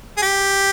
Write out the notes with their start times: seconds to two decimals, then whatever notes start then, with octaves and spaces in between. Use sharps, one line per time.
0.18 G#4
0.22 G4